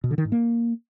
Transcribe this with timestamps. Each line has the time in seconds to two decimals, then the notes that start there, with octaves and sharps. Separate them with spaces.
0.04 B2
0.11 D3
0.18 D#3
0.25 G#2
0.32 A#3